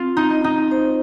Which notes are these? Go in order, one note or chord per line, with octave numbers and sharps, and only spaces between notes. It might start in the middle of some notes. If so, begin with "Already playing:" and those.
Already playing: C4 F4
D#4
D#5
D#4
C5